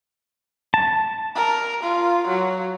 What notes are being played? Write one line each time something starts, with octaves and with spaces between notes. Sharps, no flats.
A5
A#4
F4
F#3